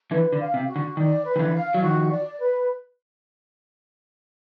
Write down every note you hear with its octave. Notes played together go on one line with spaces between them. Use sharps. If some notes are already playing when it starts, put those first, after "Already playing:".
D3 E3 B4
D3
F5
C3
F#4
D3
D#3 D5
B4
D#3
D3 E3
F5
F#3
D#3 F3 F#4
D5
B4